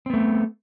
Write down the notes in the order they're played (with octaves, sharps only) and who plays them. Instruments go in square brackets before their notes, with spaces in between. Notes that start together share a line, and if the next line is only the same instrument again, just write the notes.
[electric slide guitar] C4
B3
A3